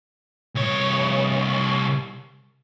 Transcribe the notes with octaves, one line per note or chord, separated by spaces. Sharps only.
C2 C#5